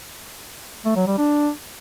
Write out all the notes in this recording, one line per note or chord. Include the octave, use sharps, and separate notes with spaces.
A3
F#3
G3
D4